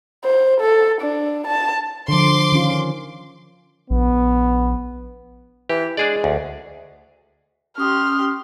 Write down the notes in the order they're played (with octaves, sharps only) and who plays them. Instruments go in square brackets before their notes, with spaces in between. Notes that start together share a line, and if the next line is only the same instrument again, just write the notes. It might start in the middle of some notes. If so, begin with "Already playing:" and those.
[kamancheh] C5
A4
D4
A5
[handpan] D3 F3 [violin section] C6 D6
[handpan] D#3 C#4 F4
[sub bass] A#1 [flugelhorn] B3
[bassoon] E3 [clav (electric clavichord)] G4
[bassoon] G#3 [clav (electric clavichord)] D4 G#4 D5
[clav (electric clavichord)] D2
[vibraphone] C#4 D#6 [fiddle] G4 C6 [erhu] F6